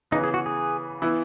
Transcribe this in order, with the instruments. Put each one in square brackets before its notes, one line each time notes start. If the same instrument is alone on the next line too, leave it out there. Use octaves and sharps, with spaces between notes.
[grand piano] C#3 E3 B3 [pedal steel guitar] D#4
[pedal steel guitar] G#4
F#4
G#4
[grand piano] E3 B3 E4